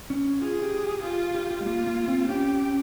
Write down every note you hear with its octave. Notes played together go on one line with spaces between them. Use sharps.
C#4
F4 G#4
G4
G4
F4 G4
G4
G4
G#3
A#3 F4
A#3
C4
C#4 G4